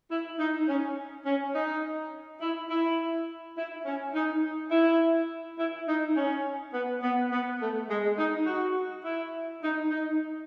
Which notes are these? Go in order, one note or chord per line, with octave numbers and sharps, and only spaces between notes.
E4
D#4
C#4
C#4
D#4
E4
E4
E4
C#4
D#4
E4
E4
D#4
C#4
B3
B3
B3
A3
G#3
D#4
F#4
E4
D#4
D#4